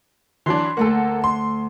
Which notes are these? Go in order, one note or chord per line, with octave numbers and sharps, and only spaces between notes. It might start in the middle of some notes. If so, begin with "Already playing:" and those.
E3 F#3 D4 C6
D2 A3 A#3 A4 F#5
C6